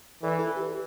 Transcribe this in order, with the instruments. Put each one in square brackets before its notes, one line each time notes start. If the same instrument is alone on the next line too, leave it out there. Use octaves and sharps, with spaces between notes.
[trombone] E3 [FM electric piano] A4 D5
[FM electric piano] E4 A4
G4 B4